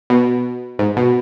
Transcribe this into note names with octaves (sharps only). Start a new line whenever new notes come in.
B2
G#2
B2